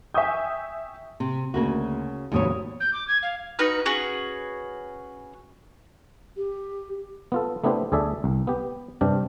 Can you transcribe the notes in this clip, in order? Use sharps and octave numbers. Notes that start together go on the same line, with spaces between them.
E5 G5 G#5 C#6 D#6 G6
C3
D2 C#3 A#3 F#4
F1 D#2 G#2 B2 C#5 D#6
G6
D6
G#6
F5
D#4 F#4 B4 F6
C#4 F#4 G#4 B4
G4
B3 F4 A4
A3 B3 D4 E4 G4 C5
D2 G#4 A4 D5 E5
C2
B3 G4
G2 C3 D4 G4